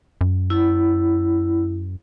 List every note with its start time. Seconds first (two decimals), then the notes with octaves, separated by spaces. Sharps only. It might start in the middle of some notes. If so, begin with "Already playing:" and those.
0.21 F#2
0.50 E4